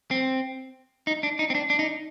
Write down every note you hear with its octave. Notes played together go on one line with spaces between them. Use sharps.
C4
D#4
D4
D#4
C4
D4
D4
D#4